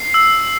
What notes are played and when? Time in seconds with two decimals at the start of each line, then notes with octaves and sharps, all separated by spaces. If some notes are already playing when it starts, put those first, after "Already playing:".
Already playing: C7
0.14 E6